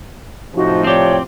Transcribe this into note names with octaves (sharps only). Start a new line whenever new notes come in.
A2 C3 F3 D#4 F#4
C4 G4 C#5 D5 G5